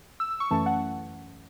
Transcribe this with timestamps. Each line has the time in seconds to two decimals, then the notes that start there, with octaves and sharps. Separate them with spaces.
0.20 E6
0.31 E6
0.40 C#6
0.51 F#2 E3 A3 C#4 A5
0.66 F#5